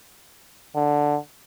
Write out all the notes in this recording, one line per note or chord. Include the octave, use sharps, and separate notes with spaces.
D3